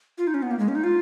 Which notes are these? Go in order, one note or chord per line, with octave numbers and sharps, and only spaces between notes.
F4
D#4
C#4
B3
A#3
G#3
C#4
D#4
F4